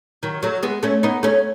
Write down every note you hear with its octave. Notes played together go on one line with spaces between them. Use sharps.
D#3 F#3
F#3 A3
G#3 B3
A3 C#4
B3 D#4
A3 C#4